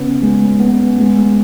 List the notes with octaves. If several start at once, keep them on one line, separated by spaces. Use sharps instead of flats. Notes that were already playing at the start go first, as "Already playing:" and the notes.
Already playing: C#3 B3
G#3
B3
G#3